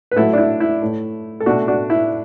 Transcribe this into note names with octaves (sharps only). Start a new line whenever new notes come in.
B4
A2 F#3 A3 E4 A4
D4
E4
E4
A2 A3
A4
B2 A3 D4 F#4
D4 F#4
E4